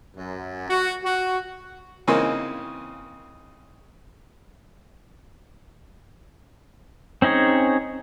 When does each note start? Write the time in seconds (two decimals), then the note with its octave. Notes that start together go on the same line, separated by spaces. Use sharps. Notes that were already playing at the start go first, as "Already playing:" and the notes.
0.16 F#2
0.70 F#4
1.04 F#4
2.07 C#3 E3 A#3 C4 D#4
7.22 C4 C#4 D#4 G#4 C#5